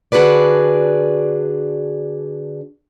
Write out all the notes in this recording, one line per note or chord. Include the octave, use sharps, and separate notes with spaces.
D3 D4 F#4 G#4 B4 D5